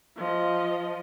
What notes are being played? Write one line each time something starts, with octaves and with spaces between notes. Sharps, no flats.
F3 D#5